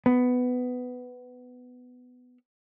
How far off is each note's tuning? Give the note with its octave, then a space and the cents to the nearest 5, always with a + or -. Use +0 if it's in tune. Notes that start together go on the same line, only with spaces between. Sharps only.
B3 +15